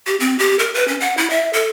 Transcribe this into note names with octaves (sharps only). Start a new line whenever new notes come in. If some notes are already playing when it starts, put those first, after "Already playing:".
G4
C4
G4
A#4
B4
C#4
F#5
E4
E5
A4